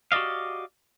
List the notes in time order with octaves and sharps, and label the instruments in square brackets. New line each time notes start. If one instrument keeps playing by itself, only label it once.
[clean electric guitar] F#4 G4 D5 D#5 F5